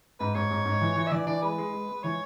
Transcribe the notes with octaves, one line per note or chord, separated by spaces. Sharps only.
G#2 B4
G#2 C#5
G#2
G#2
E3
E3
E5
E3 D5
E3 D5
G#3 B4
G#3
G#3
G#3
E3 C#5